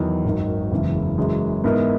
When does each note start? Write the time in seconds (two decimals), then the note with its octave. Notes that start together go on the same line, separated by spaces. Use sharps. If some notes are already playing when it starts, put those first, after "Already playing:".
Already playing: E2 D#3 F#3
0.24 G#1 F#2 D#3
0.71 F#1 E2 C#3 E3 G#3
1.18 F#2 C#3 E3 G#3
1.64 G#2 E3 B3 E4 A#4